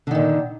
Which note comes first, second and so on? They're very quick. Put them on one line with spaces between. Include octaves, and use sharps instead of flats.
D3 D#3 A#2